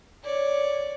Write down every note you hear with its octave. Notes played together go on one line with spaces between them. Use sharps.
C#5 D5